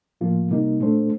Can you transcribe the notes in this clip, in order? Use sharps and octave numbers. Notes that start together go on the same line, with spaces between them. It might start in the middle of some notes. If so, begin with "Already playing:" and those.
A2 F3 A#3 F4
C3 G3 A#3 D#4
A#2 A3 D4 A4 C5